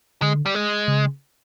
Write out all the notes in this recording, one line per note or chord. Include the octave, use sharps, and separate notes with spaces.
D3 G#3
G3
G#3
C#3